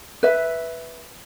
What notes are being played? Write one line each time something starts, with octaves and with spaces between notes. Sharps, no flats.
B4 E5